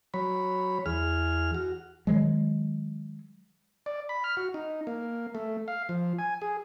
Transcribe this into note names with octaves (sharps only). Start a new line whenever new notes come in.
F#3 C#5 B5
E2 G#4 F6
F#4
D#3 F#3 G#3
D5
B5
F6
F#4
D#4
A#3
A3
F5
F3
G#5
G#4